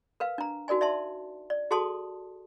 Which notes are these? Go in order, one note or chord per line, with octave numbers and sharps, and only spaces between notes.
A#4 B4 F5
D4 A#5
D#4 F#4 A#4 D5 G#5
D5 E5 A5 C6
D5
F#4 G#4 A4 A5 C6 D#6